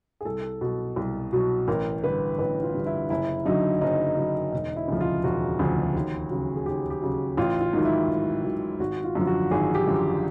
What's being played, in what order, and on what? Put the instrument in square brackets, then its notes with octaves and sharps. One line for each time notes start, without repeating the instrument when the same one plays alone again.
[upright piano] G#4
C2 A4
B2 F#3
C2
B2 F#3
A1 A#4
G2 D3 B4
A1 B4
F4
G2 D3
E4
F#1 E4
F#2 D3 F#3 D#4
F#1 D#4
F#2 D3 F#3
E1 D#4
E4
D2 C#3 F3
F4
E1 F#4
D2 C#3 F3
D#2
C#3 F#3
G#4
D#2 G4
G4
C#3 F#3
A1 F4
F4
G#2 D#3 F#3
E4
A1
G#2 D#3 F#3
G#1 F#4
F4
F#2 D3 F3
F#4
G#1 G#4
G4
F#2 D3 F3